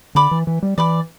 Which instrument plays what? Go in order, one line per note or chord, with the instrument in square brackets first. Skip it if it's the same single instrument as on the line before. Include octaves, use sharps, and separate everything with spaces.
[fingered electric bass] D3 [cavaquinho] D5 B5 D6
[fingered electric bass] E3
E3
G3
[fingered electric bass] E3 [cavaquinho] D5 B5 D6